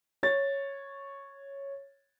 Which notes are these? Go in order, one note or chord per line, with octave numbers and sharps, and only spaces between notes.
C#5 A6